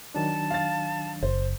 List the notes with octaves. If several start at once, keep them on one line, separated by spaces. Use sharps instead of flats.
D#3 F#3 D4 A5
F5 A6
F#1 C5